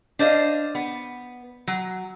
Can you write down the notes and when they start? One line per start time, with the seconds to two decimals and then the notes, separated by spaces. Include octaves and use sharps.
0.19 D4 C5 D#5 F5
0.75 B3
1.67 F#3